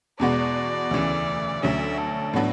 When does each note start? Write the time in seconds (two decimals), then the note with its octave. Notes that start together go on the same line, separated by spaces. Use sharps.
0.20 E2 B2 G#3 B3 F#4 D5
0.91 D2 C#3 E3
1.63 D2 D3 F#3 C#4 E5
1.98 A4
2.33 A2 F#3 B3 D4